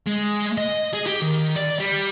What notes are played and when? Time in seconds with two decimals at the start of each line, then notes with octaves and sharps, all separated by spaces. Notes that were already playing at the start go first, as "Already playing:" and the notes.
0.07 G#3
0.58 D#5
0.93 G#4
1.06 G4
1.22 D#3
1.56 D5
1.79 G3